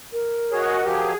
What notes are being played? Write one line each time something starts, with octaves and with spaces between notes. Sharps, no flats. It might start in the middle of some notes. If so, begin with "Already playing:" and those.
A#4
F#4 G#4 C#5 D#5 F#5
F3 F#3 G4 G#4